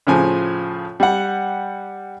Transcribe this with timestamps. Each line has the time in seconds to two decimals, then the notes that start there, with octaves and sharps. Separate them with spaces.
0.07 A2 C#3 F3 G#5
1.00 G3 F#5